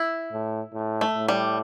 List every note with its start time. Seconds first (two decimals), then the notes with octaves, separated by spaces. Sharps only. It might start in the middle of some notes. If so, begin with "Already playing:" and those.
Already playing: E4
0.32 A2
0.74 A2
1.01 A3
1.15 A2
1.28 G3